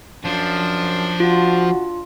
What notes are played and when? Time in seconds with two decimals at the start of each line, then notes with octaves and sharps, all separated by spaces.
0.24 F#2 F3 D4
1.20 F4 F#4